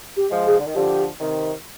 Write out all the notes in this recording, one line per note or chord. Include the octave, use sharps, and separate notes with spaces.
G4
F3 G#3
G#4
D3
D#3
D3 F3 G4
C3 D#3